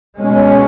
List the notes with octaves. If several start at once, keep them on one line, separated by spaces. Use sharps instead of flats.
B2 G#3 C#4